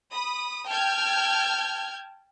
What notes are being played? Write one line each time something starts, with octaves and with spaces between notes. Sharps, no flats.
B5 D#6
G5 A5 F6 G6 G#6